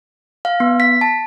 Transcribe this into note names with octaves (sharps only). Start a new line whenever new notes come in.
F5
B3
B6
A5